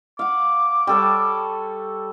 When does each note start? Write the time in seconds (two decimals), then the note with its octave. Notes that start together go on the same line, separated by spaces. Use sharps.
0.19 F5 F#5 D6
0.87 G3 A4 C#5